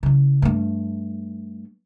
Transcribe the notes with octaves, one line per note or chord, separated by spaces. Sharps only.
C#3 E3
G2 A3